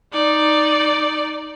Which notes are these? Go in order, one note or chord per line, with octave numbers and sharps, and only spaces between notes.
D#4 D5